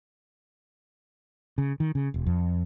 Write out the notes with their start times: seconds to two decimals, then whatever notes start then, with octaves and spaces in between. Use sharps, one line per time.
1.58 C#3
1.80 D#3
1.95 C#3
2.14 E1
2.26 F2